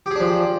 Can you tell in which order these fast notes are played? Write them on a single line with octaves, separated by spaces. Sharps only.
G4 G#4 D4 F3